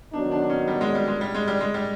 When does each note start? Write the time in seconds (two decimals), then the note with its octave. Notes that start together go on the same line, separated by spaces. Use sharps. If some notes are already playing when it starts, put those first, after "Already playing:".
0.13 D#3 F#3 B3 D4 D#4
0.31 D4
0.42 D4
0.50 C#4
0.68 G3
0.81 G#3
0.95 G3
1.08 G#3
1.21 G3
1.35 G#3
1.48 G3
1.61 G#3
1.74 G3